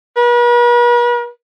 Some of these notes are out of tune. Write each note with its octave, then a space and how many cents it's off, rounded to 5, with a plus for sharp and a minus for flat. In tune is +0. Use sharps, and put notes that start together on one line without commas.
B4 -45